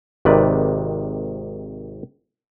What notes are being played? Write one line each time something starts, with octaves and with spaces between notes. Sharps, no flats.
G#1 C3 D#3 B4 D5